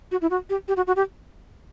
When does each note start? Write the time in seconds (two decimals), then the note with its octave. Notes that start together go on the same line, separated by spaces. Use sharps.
0.12 F#4
0.21 E4
0.30 F#4
0.50 G4
0.68 G4
0.77 F#4
0.87 F#4
0.96 G4